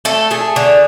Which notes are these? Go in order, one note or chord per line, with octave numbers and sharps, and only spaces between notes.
A3 A4
A3 G#4
D3